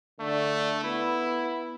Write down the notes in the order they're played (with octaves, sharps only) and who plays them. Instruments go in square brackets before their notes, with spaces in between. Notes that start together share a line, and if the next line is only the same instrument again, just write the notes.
[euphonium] D3 [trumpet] A3
[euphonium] B3 [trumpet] E4